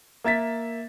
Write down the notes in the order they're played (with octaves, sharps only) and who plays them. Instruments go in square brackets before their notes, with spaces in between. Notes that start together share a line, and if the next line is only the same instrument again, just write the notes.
[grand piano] A#3 E5 A6 B6